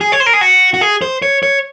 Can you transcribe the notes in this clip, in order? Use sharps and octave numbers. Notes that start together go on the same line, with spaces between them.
G#4
C#5
C5
A#4
G#4
F#4
F#4
G#4
C5
C#5
C#5